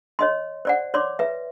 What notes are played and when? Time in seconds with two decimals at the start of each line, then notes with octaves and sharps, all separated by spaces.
0.19 C#5 D#5 C6
0.65 C5 D5 F#5
0.94 C#5 D5 C6 D6
1.19 B4 E5